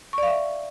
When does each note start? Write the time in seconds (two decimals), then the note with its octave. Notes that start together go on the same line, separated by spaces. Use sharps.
0.13 C#6
0.18 D5
0.23 F5
0.28 E5